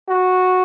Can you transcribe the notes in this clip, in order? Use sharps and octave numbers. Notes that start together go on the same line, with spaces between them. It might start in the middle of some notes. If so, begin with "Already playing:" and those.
F#4